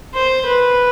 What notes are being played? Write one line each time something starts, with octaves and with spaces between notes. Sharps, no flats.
C5
B4